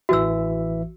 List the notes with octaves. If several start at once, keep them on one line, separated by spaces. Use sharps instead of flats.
A1 E3 F#4 E5 E6